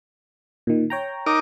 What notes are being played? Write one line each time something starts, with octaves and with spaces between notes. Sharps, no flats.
A#2 D#3
C#5 G5 A#5
D#4 A#4 D6